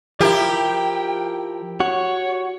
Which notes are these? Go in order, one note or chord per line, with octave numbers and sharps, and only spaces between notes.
F3 E4 G4 A#4 G5
F#4 C#5